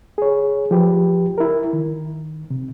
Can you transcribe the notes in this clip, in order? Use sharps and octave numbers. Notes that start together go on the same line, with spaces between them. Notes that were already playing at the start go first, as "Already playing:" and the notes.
G#4 C#5
F3 G4 B4
E4 A#4
D#3
C3